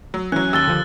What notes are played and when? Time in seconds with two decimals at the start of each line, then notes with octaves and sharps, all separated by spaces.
0.14 F#3
0.32 E3 F#3 C#4 F#6
0.53 D#2 E6 A6 G7
0.67 D3 F3